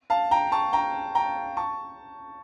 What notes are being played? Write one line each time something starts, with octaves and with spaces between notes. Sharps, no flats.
F5 A5
G5 A#5
A5 C#6
G5 A#5
G5 A#5
A5 C#6